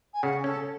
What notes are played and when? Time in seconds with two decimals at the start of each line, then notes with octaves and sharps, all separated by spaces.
0.14 G#5
0.23 C#3 F#5
0.44 C#4 A4